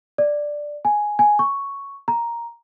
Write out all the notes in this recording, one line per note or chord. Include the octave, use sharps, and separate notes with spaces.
D5
G#5
G#5
C#6
A#5